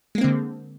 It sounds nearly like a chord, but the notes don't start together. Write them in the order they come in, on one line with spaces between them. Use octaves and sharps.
G#3 A#3 C4 D3